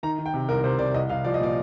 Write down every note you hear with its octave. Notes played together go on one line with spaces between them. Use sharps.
D#3 A#5
D#3
G5
C3
C2 A#4
C3 C5
C3 D5
C2 D#5
C2 F5
F3 D5
D#5
A#2 D5